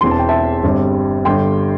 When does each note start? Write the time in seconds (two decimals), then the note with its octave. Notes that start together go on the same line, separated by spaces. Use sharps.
0.01 E1 E2 E3 C4 C6
0.11 A5
0.19 G5
0.29 E5 A5
0.63 G1 G2 G3 C4
1.25 G1 G2 D3 G5 C6